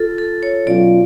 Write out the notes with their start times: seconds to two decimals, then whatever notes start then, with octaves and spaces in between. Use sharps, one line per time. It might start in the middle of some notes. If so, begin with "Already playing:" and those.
Already playing: F4 A4
0.18 A4
0.43 C#5
0.67 B2 F#3 C#4 F4 D5